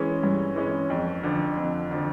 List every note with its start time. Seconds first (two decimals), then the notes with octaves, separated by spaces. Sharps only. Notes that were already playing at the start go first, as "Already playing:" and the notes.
Already playing: E3 G#3 C#4
0.23 G2
0.56 E3 G#3 C#4
0.90 F2
1.23 D3 F3
1.57 F2
1.91 D3 F3